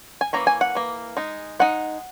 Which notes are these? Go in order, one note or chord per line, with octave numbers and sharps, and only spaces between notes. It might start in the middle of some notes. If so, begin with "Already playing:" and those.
G#5
E3 A#3 C#4 A#5
G#5
F#5
E3 A#3
G#3 D#4
G#3 D#4 F#5